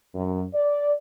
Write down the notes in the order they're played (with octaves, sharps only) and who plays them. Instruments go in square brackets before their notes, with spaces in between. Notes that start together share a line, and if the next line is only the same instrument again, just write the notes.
[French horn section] F#2
D5